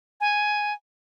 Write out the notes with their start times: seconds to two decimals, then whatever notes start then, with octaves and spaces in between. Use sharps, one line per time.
0.21 G#5